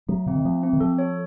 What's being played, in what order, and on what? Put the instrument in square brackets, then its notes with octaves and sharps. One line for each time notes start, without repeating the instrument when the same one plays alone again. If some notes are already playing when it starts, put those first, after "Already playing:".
[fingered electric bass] F#3 [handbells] A3
[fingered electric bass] C#3 [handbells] C4
[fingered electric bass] D#3
[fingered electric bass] F3 [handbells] A3
[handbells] C4
[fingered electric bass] D#3
[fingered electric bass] F3 [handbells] A4
[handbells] C#5